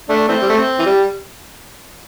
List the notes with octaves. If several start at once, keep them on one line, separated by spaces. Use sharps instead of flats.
A3 D4
E3 A3 C4
G3
A3
C4
E3
G3